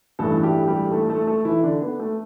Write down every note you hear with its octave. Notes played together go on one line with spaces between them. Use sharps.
A1 G2 E3 A3 A4
E4
G3 G4
G3 G4
A3 A4
A3 A4
A3 A4
E3 E4
D3 D4
B3
A3